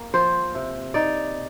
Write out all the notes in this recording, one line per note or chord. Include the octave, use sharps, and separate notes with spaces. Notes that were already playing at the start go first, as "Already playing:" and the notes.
Already playing: A#3
F3 C5
C3
D#4 D5